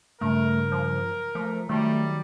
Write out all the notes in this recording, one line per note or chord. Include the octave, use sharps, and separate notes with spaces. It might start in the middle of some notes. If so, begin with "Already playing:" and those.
G2 C#3 A3 A#4
F3
F3 A3
D#3 F#3 G3 A3 D#4